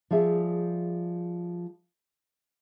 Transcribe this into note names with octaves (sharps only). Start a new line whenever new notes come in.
F3 G3 G#4 E5